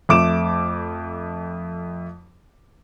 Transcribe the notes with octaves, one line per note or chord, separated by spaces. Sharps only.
F2 A3 D6 D7 E7